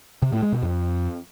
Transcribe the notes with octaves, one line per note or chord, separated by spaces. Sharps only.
C3
A2
G#3
B2
F2